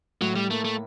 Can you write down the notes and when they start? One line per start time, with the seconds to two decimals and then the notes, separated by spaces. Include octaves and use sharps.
0.21 A2 F#3
0.36 G3
0.50 A3 A#3
0.64 A3